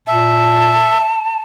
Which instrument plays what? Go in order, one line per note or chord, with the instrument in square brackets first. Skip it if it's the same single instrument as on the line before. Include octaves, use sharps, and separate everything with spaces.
[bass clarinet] A#2 [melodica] E5 [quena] A5